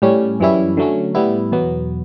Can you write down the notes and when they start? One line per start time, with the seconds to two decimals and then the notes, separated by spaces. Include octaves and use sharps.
0.02 A2 G3 C#4
0.40 F#2 E3 G3 C#4 E4
0.77 D3 F#3 A3 C#4
1.15 A2 G3 B3 E4
1.52 E2 B2 F#3 B3